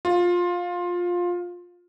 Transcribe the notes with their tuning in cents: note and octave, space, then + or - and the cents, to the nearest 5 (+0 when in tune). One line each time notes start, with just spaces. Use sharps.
F4 +15